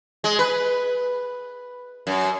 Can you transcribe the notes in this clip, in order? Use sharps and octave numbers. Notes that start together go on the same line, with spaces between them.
G#3
B4
F#2